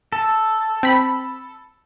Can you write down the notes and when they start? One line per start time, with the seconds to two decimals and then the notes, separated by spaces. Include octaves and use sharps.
0.12 A4
0.83 C4 B5